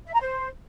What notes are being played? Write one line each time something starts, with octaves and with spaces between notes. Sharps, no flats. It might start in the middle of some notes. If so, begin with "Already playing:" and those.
E5
A#5
C5